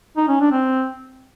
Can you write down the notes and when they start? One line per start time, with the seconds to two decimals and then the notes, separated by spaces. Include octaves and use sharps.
0.17 D#4
0.29 C#4
0.40 D4
0.52 C4